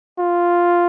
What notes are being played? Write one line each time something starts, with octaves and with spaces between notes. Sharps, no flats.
F4